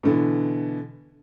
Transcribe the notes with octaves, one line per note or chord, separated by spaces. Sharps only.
B2 D3 E3